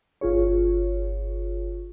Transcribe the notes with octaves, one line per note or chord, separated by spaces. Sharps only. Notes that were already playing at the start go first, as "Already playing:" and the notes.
G1 F4 G#4 C#5